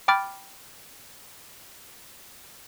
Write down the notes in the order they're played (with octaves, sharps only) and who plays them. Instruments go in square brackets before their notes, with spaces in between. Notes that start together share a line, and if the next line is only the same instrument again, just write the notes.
[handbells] G5 B5 D6 F6 A6 D7